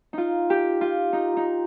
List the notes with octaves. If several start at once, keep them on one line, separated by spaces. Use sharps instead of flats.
D#4 F4
G4
F4
D#4
D#4